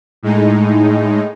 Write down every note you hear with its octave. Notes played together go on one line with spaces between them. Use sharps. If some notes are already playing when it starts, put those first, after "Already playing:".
A2 G#3 D#4